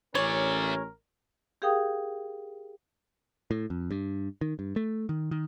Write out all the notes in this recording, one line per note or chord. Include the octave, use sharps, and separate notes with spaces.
A1 A3 C#4 A#4 C#5 D5
G4 G#4 A#4 F5 G5 D#6
A2
F2
G2
D#3
G2
A3
D#3
D#3